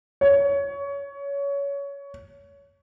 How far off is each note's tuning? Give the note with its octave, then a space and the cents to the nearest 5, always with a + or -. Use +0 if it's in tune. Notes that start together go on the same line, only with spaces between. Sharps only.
C#5 +20